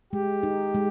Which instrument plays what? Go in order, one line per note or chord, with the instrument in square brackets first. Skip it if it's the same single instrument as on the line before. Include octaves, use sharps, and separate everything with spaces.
[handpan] G#3 [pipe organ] G4
[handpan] D#4
G#3